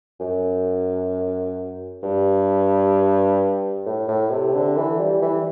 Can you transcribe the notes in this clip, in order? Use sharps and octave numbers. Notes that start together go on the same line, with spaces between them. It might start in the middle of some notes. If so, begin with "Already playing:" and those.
F#2
G2
A2
A2
C3
D3
E3
G3
E3